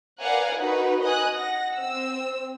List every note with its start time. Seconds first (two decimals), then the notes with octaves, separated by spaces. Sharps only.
0.21 A#4 B4 D5 F5 F#5 G#5
0.60 D#4 F#4 A#4 B4
1.03 D#5 G#5 D#6 F#6
1.34 F#5 A#6
1.76 C4 E6